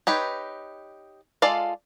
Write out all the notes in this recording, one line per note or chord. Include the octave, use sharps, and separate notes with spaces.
D#4 G4 B4 C#5
G#3 F4 A4 D5 F5